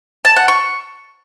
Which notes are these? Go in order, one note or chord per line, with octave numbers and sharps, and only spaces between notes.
A5
F#5
C#6